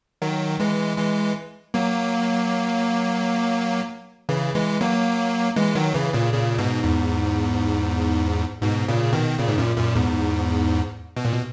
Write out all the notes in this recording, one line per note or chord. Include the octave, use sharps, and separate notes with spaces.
D#3 F#3
E3 G#3
E3 G#3
F#3 A#3
C#3 E3
E3 G#3
F#3 A#3
E3 G#3
D#3 F#3
C#3 E3
A#2 C#3
A#2 C#3
G#2 B2
E2 G#2
G#2 B2
A#2 C#3
B2 D#3
A#2 C#3
G#2
F#2 A#2
F#2 A#2
E2 G#2
B2
A#2
B2